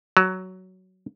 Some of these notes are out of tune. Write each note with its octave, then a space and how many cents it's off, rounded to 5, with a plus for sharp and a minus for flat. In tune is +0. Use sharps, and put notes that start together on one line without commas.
F#3 +10